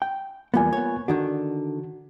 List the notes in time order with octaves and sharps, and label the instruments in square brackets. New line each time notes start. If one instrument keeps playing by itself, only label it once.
[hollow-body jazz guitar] G5
[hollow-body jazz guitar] E2 G3 B3 [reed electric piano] A#3 F4 G#5
[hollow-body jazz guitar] B3 C#5
[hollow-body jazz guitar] D3 D#3 D4 [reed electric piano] F#4